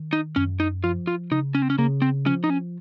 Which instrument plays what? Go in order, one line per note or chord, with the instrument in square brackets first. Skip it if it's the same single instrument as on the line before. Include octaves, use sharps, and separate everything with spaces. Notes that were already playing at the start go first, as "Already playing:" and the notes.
Already playing: [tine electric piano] D#3
[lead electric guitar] D#4
[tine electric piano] F#2 [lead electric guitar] C#4
[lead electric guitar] D#4
[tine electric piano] F3 [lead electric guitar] F4
[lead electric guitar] F4
[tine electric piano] C#3 [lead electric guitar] D#4
[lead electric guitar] C#4
C4
C#4
[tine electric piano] C#3 [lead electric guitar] A#3
[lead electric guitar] C4
[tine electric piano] F3 [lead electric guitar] C#4
[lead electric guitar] D#4
C#4